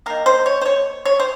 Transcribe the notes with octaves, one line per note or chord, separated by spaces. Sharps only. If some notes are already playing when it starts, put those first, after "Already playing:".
D#3 A#3 A#4
C5
C#5
C5
C#5
C#5
C5